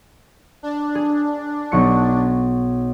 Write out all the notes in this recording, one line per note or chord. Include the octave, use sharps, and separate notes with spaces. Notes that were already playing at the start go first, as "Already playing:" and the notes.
D4
G#4
B1 C#6 C#7